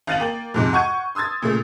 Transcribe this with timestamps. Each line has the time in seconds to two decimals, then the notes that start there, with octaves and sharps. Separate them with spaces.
0.07 G#1 F5 A6 D#7 F#7
0.20 A#3 G5 F#7
0.54 F2 G#2 C3
0.73 F#5 C#6 G6 G#6 D#7
1.15 C6 D#6 E6 G#6 A6
1.42 A#2 C#3 A3